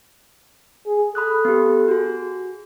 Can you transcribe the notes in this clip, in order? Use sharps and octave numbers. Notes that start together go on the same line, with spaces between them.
G#4
A4 B5 D#6 F#6
B3 G4
F#4 G#4